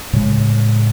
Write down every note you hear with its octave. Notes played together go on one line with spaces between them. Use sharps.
A2 C#3 G#3